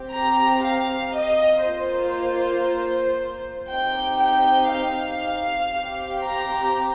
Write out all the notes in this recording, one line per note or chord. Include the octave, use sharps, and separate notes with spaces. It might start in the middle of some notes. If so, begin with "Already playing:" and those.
Already playing: C4 G4
A#5
F5
D#5
A#3 F4 C5
C4 D#4 G4 G5
G5
F5
C4 G4
A#5